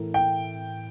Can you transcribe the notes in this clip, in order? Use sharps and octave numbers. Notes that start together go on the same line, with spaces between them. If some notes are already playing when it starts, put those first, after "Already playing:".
Already playing: A2 E3 A3 E4 A#4
G5